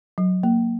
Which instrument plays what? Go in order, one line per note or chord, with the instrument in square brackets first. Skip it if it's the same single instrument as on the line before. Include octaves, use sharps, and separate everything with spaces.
[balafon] F#3
A#3